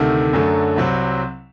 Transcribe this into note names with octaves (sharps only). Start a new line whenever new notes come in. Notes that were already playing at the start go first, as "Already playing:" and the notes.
Already playing: D2 C3 D#3 A3
F#2 D3 F#3 A3
C2 C3 F#3 C4